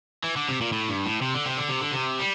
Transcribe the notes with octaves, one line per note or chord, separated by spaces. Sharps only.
E3
D3
C3
A#2
A2
G2
A2
C3
D3
C3
D3
C3
D3
C3
G3